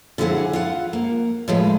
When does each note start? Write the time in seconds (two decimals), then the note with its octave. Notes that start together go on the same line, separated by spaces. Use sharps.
0.18 D3 F3 F#3 E4 G#4 F#5
0.53 F4 F5 F#5
0.93 A#3
1.48 A2 F3 G#3 B4